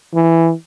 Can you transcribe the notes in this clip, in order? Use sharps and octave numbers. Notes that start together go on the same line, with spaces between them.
E3